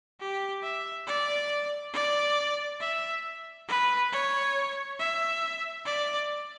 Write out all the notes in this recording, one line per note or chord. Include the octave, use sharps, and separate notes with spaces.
G4
E5
D5
D5
E5
B4
C#5
E5
D5